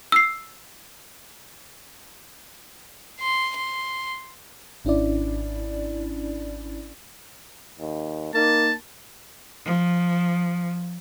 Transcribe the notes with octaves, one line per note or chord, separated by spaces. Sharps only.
E6 C7
C6
C6
G#1 C#4 D4 E4 D5
D#2
A#3 D#4 A5
F3